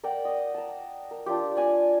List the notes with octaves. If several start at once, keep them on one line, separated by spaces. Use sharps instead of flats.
A#4 D5 F#5 G5
D#5 D6
A5 A#5
A#4
D4 F4 G4
D5 G#5 A#5